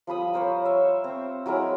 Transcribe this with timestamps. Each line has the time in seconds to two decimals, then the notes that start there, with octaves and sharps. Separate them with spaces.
0.07 F3 G3 B5 D#6
0.33 A#4 C5 C#5
0.65 E5
1.04 C4
1.46 F#3 G#3 E4 A#4